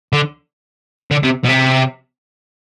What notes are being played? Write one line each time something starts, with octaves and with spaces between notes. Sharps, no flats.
D3
D3
C3
B2
C3